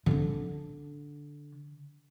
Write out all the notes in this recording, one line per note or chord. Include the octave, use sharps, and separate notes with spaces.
D3 D4